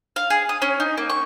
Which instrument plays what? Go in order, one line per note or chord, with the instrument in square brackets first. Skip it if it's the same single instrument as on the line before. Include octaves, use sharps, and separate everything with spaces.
[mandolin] F5
G#4
D#6
C#4
D#4
A#3
C#6